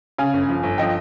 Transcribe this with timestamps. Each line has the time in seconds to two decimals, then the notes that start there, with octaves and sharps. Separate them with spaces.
0.19 C#3 F5 G#5
0.33 G1
0.49 F3
0.63 G1
0.78 F3 D#5 G5